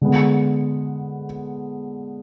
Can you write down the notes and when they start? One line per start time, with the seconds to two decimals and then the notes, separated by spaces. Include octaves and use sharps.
0.01 D3 G#3 B3